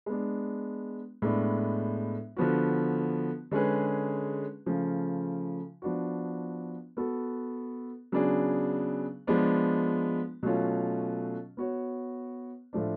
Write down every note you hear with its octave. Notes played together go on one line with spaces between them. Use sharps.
G#3 B3 D4
A2 G#3 B3 D4
D3 F3 B3 F#4
D3 G#3 C#4 G#4 B4
C#3 F3 A3
F3 B3 D4 F#4
B3 F#4 A4
C#3 F#3 B3 D4 G#4
F3 G#3 B3 D4
B2 F#3 A3 C#4 F4
B3 F#4 C#5
A2 F3 A3 D4